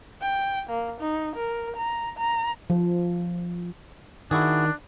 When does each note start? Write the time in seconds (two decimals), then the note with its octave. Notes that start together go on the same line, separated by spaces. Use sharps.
0.22 G5
0.70 A#3
1.01 D#4
1.36 A#4
1.77 A#5
2.18 A#5
2.70 F3
4.31 D#3 D4 E4 F#4 G#4